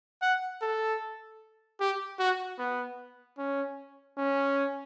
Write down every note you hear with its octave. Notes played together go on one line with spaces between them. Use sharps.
F#5
A4
G4
F#4
B3
C#4
C#4